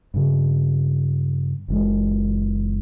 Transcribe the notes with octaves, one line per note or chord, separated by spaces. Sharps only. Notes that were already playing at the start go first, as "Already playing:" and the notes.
G2 C#3
F#1 E3 G#3